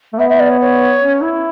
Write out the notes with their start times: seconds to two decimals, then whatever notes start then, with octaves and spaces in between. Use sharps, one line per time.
0.13 A3
0.18 B3 E5
0.29 E5
0.39 D5
0.49 C#5
0.61 C#5
1.01 C#4
1.21 E4